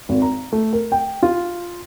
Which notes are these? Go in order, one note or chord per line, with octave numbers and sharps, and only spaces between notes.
G#1
A#5
A3
A#4
G5
F4